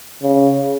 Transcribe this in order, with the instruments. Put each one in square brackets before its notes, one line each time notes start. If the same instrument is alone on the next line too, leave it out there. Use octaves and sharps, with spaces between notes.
[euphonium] C#3